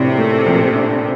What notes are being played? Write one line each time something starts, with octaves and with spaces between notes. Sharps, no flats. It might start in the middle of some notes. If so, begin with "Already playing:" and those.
Already playing: A#1 A2 C3 D4
A3
A#1
D4